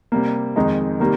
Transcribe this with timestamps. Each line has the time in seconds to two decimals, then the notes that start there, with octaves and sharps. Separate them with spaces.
0.12 C3 G3 A#3
0.56 F2 D#3 G#3 D#4
1.00 C3 D#3 G3 A#3